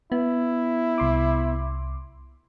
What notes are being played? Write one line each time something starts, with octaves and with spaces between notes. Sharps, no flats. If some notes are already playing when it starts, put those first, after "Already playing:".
B3 E4
C2 C6 D6